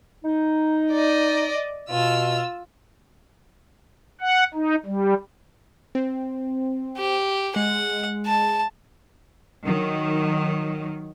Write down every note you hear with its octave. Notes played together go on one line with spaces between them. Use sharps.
D#4
D5 D#5
B2 F4 E6
F#5
D#4
G3
C4
G4
G#3 F#5
A5
D#3 F#3